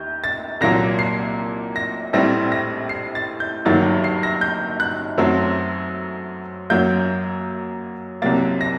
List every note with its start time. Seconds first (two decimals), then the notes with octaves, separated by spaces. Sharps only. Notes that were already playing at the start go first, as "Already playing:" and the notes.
Already playing: D#2 G6
0.24 A6
0.61 C2 A#2 F#3 A#3 A#6
0.99 C7
1.76 A#6
2.13 A#1 A2 G3 C4 A#6
2.52 A#6
2.89 C7
3.15 A6
3.40 G6
3.65 G1 G2 D#3 F#3 A#3 A6
4.04 C7
4.23 A#6
4.41 G6
4.80 F#6
5.18 F#2 F#3 A3 C4
6.70 F#2 F#3 A#3 G6
8.22 C2 C3 F#3 A#3 A6
8.61 A#6